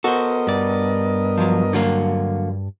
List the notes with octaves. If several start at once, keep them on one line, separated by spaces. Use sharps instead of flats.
B3 F#4 A4 A#4 C5 D#5
G2 D5
F3 F#3
D3 F#3 A#3